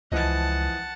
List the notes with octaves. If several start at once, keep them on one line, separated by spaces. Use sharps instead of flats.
C#2 E3 F3 D#5 F#5 A5